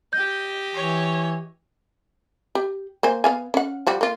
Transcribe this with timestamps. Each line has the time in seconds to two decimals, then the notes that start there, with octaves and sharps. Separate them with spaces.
0.13 G4 D#5 G6
0.74 E3 C#5
2.55 G4
3.03 A#3 C5 G#5
3.24 B3 F5 G#5
3.54 C#4 F#5
3.87 F3 G3 F#4
4.01 A#3 F4